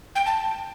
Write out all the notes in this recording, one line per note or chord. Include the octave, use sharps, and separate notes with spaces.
G5
A5